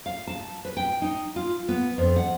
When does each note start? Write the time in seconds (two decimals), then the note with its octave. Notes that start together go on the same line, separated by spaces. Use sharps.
0.06 F5
0.27 A5
0.65 B4
0.77 G5
1.02 D#4
1.36 F4
1.69 B3
1.98 F2
2.16 F#5